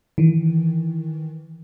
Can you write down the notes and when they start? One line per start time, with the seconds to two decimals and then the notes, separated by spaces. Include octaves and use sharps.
0.18 D#3 E3